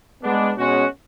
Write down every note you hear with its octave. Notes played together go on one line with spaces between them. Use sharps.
G#3 B3 D4
B2 G#3 C#4 F#4